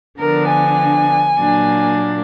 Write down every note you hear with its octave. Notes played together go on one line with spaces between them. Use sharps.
D3 F3 B3 D4 A#4
G#5
A#2 F#3 A#3 D4